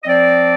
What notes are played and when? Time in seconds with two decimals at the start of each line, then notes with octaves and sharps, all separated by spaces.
0.03 D#5
0.07 F3 C4 D5